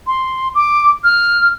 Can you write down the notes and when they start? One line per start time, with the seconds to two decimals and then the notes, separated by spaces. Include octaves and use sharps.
0.07 C6
0.55 D6
1.04 F6